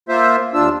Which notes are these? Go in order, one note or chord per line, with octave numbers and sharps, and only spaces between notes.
A#3 F4 C5 E5
D#2 D4 F4 E6